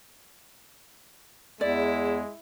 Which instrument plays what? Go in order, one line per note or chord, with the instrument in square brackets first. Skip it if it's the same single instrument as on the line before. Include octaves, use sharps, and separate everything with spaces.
[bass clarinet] E2 [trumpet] G#3 [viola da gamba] E4 [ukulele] D5